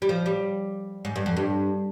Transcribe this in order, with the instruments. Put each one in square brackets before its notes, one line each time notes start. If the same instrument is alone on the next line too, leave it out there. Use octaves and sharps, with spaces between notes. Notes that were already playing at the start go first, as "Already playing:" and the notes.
[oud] G3
F3
G3
G#2
G2
F2
G2